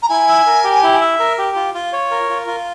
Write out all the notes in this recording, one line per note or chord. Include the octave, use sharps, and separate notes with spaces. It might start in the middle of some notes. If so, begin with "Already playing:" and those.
A#5
E4 G#5
E5
A#4
G4
E4
E5
A#4
G4
F4
F4
C#5
A#4
F4
F4